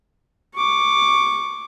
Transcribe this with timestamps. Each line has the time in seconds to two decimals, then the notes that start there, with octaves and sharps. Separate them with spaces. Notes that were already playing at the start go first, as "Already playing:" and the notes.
0.55 C#6 D6